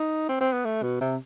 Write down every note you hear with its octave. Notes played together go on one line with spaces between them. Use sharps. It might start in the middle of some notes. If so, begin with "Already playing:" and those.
Already playing: D#4
C4
C4
B3
A3
B2
C3